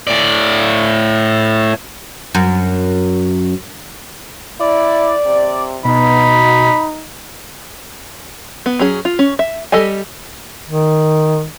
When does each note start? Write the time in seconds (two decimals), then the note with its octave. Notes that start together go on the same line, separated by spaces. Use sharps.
0.07 A2 D5
2.35 F#2
4.60 E4 D5
5.25 C3
5.85 B2 D#4 B5
8.66 B3
8.79 F#3 C#4 G#4
9.05 F4
9.19 C#4
9.39 E5
9.72 G3 G4 A4 D#5 G#5
10.67 D#3